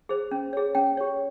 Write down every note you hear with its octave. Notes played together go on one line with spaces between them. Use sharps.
G#4 C5
C#4
G#4 C#5
C#4 G5
G4 C#5